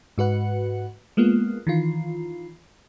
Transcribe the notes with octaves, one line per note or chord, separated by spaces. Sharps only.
G#2 F#4 B4 F#5
G#3 A#3 B3 F4
D#3 E3 F4